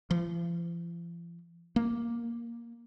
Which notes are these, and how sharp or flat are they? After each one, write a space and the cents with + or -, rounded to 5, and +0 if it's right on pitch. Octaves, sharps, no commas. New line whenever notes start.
F3 -45
A#3 +5